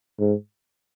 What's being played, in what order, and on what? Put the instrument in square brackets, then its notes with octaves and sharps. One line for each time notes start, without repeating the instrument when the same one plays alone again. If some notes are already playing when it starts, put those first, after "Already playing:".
[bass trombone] G#2